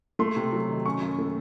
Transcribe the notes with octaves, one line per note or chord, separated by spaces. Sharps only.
A3 C6
C3
F#3
D#3
C#4 C#6
F#2
A3